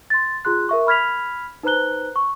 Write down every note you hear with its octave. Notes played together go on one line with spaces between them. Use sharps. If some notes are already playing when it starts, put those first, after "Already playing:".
C6 A6
F4 G#4 C6 F#6
A#4 E5 C#6
B5 F6 G#6 B6 F7
D#4 B4 C5 A#5 F#6 G7
C#6